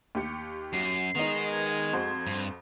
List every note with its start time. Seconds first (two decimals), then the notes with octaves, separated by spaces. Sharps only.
0.15 D#2 G4 C#7
0.73 F#2 F#4 C7
1.15 D#3 G#3 B3 D#4
1.52 G#6
1.93 F2 F#4 C5
2.27 G2